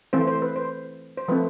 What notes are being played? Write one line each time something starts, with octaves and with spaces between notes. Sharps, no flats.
E3 A3 C4 C5
C5
B4
C5
C5
F3 A3 C4 B4